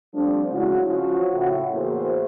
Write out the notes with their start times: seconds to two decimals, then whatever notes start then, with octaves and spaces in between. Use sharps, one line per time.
0.14 F3 G3 A3 C4 D4
0.51 C#3 G#3 E4 F#4
0.87 F3 C#4 F4 F#4
1.33 A2 C#3 F#4
1.73 E2 A2 A#3 F#4 G#4 C5